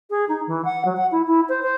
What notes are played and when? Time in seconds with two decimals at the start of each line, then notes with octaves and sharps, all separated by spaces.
0.10 G#4
0.28 D#4
0.47 E3
0.65 F#5
0.85 F#3
0.96 F#5
1.11 E4
1.27 E4
1.49 C5
1.62 C5